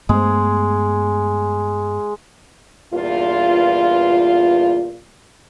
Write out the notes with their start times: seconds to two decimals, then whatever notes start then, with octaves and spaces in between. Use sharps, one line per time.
0.09 G2 G#3 A3 B3
2.93 E2 G2 A#2 F4